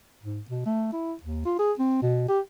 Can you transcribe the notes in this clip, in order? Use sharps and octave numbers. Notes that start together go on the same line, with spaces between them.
G#2
B2
A3
E4
D#2
F4
G#4
C4
B2
G4